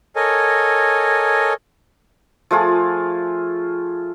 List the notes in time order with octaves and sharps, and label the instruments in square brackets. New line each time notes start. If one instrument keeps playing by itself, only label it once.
[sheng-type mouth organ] A4 A#4 C#5 D#5 G#5
[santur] F3 A3 F4 G#4